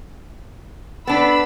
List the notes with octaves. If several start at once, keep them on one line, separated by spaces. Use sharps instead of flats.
B3 D4 A5 B5 E6